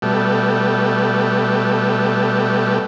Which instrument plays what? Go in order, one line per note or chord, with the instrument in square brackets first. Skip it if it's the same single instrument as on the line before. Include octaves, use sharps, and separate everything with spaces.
[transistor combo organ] B2 G3 A3